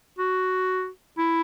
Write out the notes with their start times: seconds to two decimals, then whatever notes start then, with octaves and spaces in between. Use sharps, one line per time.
0.18 F#4
1.18 E4